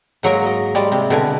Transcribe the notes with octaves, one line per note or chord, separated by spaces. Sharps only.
G#2 F#3 A#3 A#4
D#5
G3 G#3 D5
C3
B2 D3 A#4 B4 G#5